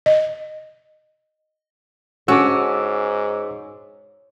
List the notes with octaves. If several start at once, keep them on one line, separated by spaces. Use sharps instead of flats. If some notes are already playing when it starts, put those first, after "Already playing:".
D#5
G#2 C#4 F#4 A4 D6 E6